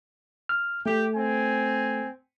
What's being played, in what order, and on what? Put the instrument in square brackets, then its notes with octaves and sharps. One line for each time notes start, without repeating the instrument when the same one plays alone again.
[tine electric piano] F6
[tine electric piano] A3 [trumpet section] G4
[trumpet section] C4 G#5